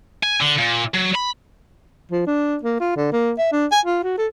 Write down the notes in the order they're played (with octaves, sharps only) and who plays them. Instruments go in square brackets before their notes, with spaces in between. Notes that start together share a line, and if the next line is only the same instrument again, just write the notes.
[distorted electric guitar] G#5
D3
A#2
F#3
B5
[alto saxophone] F3
D4
A#3
F4
D3
A#3
E5
D4
G#5
F4
F#4
A4